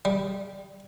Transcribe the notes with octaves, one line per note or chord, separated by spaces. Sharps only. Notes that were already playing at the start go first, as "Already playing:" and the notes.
G3